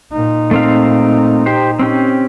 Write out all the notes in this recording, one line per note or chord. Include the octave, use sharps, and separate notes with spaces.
A#2 D#4
A3 C4 F5
G4 C5
C4 C#4 G4